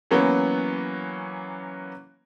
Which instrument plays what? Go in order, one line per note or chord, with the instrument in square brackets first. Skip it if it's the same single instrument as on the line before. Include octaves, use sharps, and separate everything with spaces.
[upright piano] E3 F#3 A#3 B3 C#4